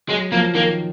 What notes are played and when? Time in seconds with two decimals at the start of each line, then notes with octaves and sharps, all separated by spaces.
0.09 F#3 G#3
0.32 F3 A#3
0.55 D#3 A#3